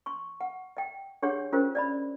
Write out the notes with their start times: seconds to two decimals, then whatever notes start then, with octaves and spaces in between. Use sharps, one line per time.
0.06 C6 C#6
0.41 F#5
0.77 D#5 G5
1.22 D4 G4 G#4 C#5 F#5 C6
1.53 C#4 F4 G4 A#4 C5 D#5
1.75 D5 D#5 B5